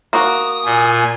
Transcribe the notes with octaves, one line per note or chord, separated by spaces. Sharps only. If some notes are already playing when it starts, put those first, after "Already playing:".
A#3 F#4 D#6
A#2 G#5